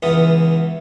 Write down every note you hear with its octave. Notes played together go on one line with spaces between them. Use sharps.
C#2 E3 B3 F4 D#6